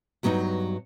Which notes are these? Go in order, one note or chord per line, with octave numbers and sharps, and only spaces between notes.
G2 F#3 B3 C#4 D#4